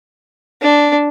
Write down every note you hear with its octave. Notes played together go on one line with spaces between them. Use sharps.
D4